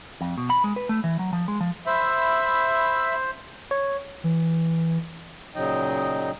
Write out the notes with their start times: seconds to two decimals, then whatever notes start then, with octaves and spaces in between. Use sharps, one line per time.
0.21 F2
0.38 B2
0.50 B5
0.64 G#3
0.76 B4
0.89 A3
1.04 E3
1.19 F#3
1.33 F3
1.48 G#3
1.60 F3
1.86 C5 E5 B5
3.71 C#5
4.24 E3
5.55 A#2 C#3 F#3 D#4 D#5 G5